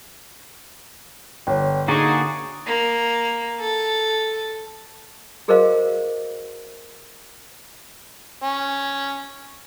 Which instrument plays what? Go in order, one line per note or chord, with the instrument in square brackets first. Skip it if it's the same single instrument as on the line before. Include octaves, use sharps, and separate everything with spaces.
[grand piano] G1 [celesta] C#5 G5
[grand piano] D3 [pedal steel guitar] A#3 F#4 D5 [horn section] D#4 G#4 [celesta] A#5 C#6
[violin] A#3
A4
[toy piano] F#4 G#4 A#4 C5 D#5 F5
[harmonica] C#4